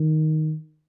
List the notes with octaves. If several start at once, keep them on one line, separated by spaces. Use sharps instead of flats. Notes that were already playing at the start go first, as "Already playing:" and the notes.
Already playing: D#3